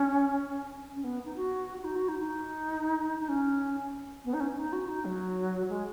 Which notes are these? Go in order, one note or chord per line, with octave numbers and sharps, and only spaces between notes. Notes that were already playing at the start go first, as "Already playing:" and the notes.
Already playing: C#4
C#4
B3
D#4
F#4
F#4
D#4
F#4
D#4
D#4
D#4
C#4
B3
D#4
C#4
D#4
F#4
D#4
F#3
G#3